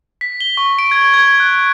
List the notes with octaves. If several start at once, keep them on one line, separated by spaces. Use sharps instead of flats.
B6
G7
C#6
D7
G#6
G#6
F#6